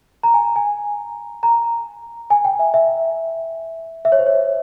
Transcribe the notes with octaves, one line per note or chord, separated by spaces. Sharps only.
A#5
G#5
G#5
A#5
G#5
G5
E5
E5
E5
C#5
C5
C#5